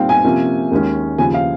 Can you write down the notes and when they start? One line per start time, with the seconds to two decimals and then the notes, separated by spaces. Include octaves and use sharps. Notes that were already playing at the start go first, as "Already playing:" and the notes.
Already playing: A#2 G3 C4 D#4 F5 G5
0.09 G#5
0.24 C3 F3 A#3 C#4
0.71 D#2 D#3 G#3 C#4
1.18 D#2 C#3 F3 G#5
1.34 F5